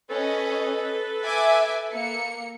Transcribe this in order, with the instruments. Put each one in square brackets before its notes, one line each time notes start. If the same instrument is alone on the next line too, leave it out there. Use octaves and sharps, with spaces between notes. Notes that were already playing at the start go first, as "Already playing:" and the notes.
[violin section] C#4 D#5 [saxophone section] A4 B4
[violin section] E5 G#5 D6
A#3 C#7